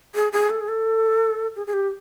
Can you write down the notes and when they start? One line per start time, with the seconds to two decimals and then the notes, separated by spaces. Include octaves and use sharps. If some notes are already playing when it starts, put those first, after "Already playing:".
0.15 G#4
0.32 G#4
0.50 A4
0.61 G#4
0.68 A4
1.56 G#4
1.67 G#4
1.73 G4